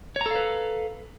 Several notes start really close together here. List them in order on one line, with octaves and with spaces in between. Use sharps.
C#5 A#5 A4 F5 B4